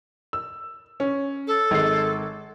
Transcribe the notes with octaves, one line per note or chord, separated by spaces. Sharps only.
E6
C#4
A4
G#1 G#3 C7